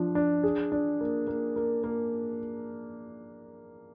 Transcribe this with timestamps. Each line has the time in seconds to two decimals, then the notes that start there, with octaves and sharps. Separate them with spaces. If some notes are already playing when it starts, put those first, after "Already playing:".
Already playing: F3 D4
0.15 D4
0.43 G#4
0.72 D4
1.00 A#3
1.27 A#3
1.56 A#3
1.84 A#3